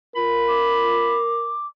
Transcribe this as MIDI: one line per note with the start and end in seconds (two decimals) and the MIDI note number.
0.16 1.17 65
0.16 1.54 70
0.16 1.17 83
0.48 1.67 86